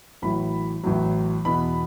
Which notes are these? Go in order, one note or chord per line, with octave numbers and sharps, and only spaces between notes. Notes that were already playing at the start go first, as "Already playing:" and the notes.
A1 A2 F#3 B5
A1 A2 F#3
E2 B2 B3 B5